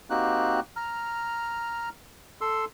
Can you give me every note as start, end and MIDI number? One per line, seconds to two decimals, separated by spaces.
0.10 0.60 58
0.10 0.60 60
0.10 0.60 63
0.10 0.60 66
0.10 0.60 67
0.10 0.60 90
0.76 1.89 82
0.76 1.89 89
2.41 2.65 69
2.41 2.65 84
2.41 2.65 88